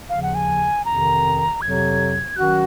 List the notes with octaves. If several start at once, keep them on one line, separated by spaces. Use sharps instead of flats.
D#2 C#3 F3 F5
F#5
G#5
F2 C3 D#3 A#5
F2 C3 F#3 G#6
D#3 F#3 C#4 F#4 F#6